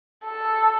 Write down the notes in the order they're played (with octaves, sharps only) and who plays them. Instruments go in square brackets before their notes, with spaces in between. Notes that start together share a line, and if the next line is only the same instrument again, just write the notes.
[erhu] A4